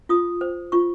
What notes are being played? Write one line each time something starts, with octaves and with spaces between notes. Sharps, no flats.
F4 D#6
C5
F4 C#6